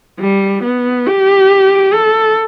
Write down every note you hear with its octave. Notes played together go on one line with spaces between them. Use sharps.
G3
B3
G4
A4